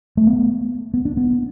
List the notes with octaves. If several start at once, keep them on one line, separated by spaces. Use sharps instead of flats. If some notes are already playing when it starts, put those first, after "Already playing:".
A3
B3
B3
D4
B3